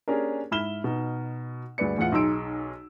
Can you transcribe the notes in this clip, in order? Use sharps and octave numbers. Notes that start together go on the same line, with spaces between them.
A#3 C#4 D4 G4 G#4 A#4
G#2 E4 B5 F6 E7 G7
B2 D#4
D2 G2 G#4 B4 D5 C#7
E2 A2 F4 F#5 C#7
B1 D#4 G#4 C6 E6 D7